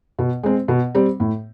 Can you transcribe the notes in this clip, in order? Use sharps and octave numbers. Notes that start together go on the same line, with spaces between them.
B2
G#3 C4
B2
G3 C4
A2